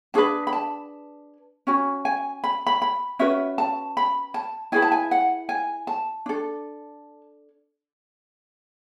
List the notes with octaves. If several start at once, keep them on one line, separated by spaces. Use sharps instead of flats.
D4 G#4 B4 A5
B5
A5
C#4 F#4 G#5
G#5
B5
B5
B5
C#4 F#4 B4 E5
A5
B5
A5
E4 G#4 B4 G#5
A5
G#5
F#5
G#5
A5
D4 A4